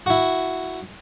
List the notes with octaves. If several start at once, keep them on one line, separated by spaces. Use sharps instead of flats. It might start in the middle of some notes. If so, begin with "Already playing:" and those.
E4 F#4